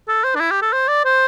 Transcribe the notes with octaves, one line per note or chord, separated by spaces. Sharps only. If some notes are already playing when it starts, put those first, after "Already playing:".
A4
C5
D4
E4
G4
A4
C5
D5
C5